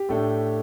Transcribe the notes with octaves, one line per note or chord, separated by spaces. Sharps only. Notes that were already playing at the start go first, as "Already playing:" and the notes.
Already playing: G4
A2 A3 D4